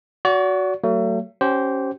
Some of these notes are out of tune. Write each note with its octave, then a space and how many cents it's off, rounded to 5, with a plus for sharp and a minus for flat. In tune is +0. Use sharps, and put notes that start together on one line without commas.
F#4 +0 D5 -40
F#3 +25 A3 +40
C#4 +0 G4 -30 C5 +0